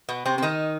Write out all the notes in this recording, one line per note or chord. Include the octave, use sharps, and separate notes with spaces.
B2 B3
C3 C4
C4
D#3 D#4